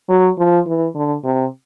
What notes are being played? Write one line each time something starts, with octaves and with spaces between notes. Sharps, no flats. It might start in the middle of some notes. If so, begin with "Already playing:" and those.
F#3
F3
E3
D3
C3